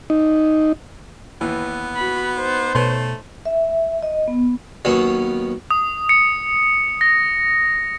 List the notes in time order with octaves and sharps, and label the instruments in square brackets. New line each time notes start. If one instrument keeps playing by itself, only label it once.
[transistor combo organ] D#4
[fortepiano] D#2 E3 [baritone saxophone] B3
[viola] F#4 B5
D#4 C5
[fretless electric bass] B2 [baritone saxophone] A3 [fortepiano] B4 C#5 C6
[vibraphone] E5
D#5
B3
[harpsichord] D#2 F#3 B3 C#4
[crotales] D#6
C#7
A#6